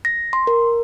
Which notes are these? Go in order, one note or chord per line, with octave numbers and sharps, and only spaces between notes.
A#6
C6
A#4